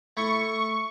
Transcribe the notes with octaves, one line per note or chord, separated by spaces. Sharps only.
A3 E4 C#6